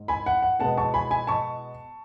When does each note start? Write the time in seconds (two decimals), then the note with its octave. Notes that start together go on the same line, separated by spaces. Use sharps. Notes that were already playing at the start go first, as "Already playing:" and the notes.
Already playing: G#2
0.08 G#5 B5
0.26 F#5
0.42 F#5
0.60 B2 G#3 B3 F#5 A5
0.78 A5 C#6
0.94 G#5 B5
1.11 G#5 B5
1.27 A5 C#6